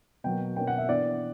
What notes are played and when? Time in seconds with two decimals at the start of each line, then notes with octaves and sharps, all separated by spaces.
0.24 B2 F#3 A#3 G5
0.56 B2 A#3 C#4 G5
0.67 F#5
0.78 E5
0.89 E3 B3 D4 D5